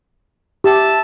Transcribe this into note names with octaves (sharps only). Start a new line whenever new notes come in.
G4 E5 A5